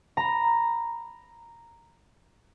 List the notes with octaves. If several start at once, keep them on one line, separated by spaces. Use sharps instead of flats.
A#5 B5